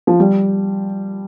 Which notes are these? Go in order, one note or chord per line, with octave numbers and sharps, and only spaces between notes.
F3
G3